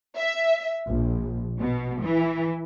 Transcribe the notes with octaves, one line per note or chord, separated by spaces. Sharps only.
E5
A#1
B2
E3